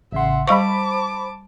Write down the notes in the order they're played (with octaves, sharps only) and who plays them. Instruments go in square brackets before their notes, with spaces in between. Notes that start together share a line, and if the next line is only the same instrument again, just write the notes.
[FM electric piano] A1 C#3 C6 [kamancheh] E5 F#5
[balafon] G3 F5 C#6 [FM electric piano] C5 B5 [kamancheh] A5 D6